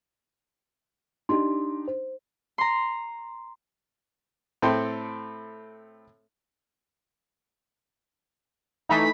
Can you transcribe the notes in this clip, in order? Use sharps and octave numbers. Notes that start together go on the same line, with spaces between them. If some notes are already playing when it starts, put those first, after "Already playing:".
D4 D#4 G4 C6
C5
A#5 C6
A2 C4 A4 G5 C6
E3 A3 D#4 B5